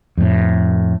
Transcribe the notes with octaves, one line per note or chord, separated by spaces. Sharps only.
F2 A2